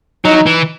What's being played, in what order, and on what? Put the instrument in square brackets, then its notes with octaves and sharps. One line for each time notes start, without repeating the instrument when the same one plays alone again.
[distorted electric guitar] F#3 [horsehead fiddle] D#4
[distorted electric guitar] E3